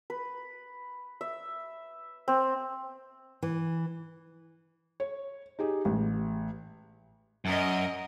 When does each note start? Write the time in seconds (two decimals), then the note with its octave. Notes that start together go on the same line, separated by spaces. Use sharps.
0.10 B4
1.21 E5
2.28 C4
3.42 E3
5.00 C#5
5.59 D#4 G4 G#4
5.85 A1
7.45 F#2 A#4 D#5